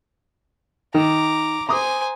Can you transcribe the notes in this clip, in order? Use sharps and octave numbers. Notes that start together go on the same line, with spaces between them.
D#3 A#5 D6
C5 G#5 A#5 D6 D#6